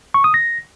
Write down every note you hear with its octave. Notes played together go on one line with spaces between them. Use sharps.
C#6
D#6
A#6